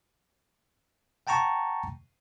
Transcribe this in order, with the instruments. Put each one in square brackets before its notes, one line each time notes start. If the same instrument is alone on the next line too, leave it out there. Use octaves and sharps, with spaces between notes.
[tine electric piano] F#5 G5 A5 A#5 C#6